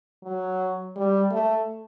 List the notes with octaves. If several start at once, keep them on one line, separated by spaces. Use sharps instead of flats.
F#3
G3
A3